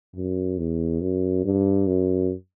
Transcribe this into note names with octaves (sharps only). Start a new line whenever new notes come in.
F#2
E2
F#2
G2
F#2